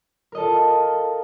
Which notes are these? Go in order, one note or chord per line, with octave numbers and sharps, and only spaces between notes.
F4 A4 A#4 D#5